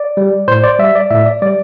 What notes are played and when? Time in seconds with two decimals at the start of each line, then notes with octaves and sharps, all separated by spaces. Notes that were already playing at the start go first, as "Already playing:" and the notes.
Already playing: D5
0.17 G3
0.48 A2 C5
0.64 D5
0.79 G3 E5
0.95 D5
1.10 A2 E5
1.26 D5
1.42 G3 D5